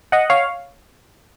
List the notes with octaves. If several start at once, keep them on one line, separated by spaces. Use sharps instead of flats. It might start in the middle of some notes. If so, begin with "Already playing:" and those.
D#5 F#5
C#5 F5